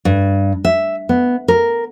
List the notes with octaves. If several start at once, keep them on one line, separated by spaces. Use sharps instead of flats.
G2
E5
B3
A#4